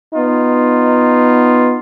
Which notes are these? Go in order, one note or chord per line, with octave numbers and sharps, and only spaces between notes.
B3 D#4 F4